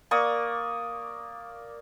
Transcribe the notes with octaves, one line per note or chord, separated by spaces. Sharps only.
A#3 D5 C#6 D#6